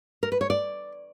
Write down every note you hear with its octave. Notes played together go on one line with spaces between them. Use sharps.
A#4
B4
C#5
D5